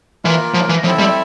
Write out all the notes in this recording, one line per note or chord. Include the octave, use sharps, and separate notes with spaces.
E3 A#3 F4 A#4
F3
E3
F3 C4 E4 A4 E5
G3